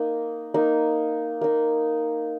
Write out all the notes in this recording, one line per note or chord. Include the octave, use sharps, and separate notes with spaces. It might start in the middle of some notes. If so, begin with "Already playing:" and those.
Already playing: A#3 D#4
A#3 D#4
A#3 D#4